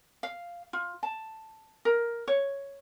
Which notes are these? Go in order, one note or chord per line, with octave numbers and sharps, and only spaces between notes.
F5
F4
A5
A#4
C#5